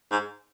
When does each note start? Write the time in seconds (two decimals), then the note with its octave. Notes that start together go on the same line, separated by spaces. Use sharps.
0.11 G#2